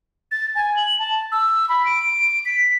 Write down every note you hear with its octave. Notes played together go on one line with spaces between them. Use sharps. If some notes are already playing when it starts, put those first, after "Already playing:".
A6
G#5
F#7
A5
E6
B5
D7
B6